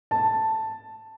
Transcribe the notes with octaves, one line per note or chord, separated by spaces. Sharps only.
A5